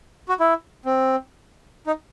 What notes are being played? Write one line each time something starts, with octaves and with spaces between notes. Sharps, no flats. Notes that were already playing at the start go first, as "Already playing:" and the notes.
F#4
E4
C4
D#4